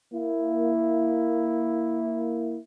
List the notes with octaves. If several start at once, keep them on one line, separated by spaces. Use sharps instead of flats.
A#3 E4